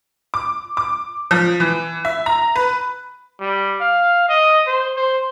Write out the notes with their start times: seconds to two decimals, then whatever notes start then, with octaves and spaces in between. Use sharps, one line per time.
0.34 D6
0.77 D6
1.31 F3
1.60 E3
2.05 E5
2.26 A#5
2.56 B4
3.40 G3
3.80 F5
4.29 D#5
4.67 C5
4.96 C5